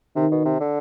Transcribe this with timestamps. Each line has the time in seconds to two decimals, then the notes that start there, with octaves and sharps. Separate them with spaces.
0.16 C3 D#3
0.31 B2
0.45 C3
0.60 D3